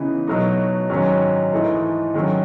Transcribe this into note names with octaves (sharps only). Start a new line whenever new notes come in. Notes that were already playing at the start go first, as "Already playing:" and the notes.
Already playing: C#3 E3 B3 D#4
B2 F#3 A3 D#4
G#2 D#3 F#3 C#4
G#2 E3 A3 D#4
D#3 F#3 A3 C#4